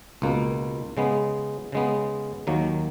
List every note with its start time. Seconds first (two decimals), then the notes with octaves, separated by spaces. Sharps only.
0.22 C#2 B2 A#3
0.97 C#3 G#3 B3
1.72 C#3 G#3 B3
2.47 D#2 D#3 F#3 A#3